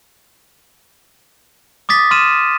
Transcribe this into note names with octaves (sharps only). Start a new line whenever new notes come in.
D6 D#6 A6 B6
C6 D#6 F6 D#7 E7